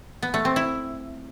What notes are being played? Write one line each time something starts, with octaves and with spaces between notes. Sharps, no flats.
B3
A3
C4
E4